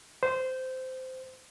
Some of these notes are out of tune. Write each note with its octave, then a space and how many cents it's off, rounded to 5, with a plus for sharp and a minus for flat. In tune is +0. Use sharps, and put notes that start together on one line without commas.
C5 -15